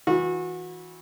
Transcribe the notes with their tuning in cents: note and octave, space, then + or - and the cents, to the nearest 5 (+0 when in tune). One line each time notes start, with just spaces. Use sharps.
E3 -20 F#4 -30